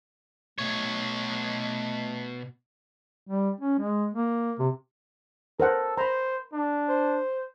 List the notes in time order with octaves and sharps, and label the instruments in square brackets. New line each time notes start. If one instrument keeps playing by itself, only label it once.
[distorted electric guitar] B2 C#5 [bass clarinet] A3
[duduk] G3
C#4
G#3
A#3
C3
[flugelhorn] A4 [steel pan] A#4 C5 F#5
[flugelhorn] C5 [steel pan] A#5 B5
[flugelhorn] D4
[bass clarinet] C5